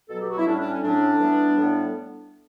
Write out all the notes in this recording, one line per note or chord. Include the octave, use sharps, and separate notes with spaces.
B2 F#3 B3 A4
G4
F#4
E4
A2 G3 C#4 D4
D4
C#4
A2 F#3 C#4 D4
E3 G3 B3
A2 G3 B3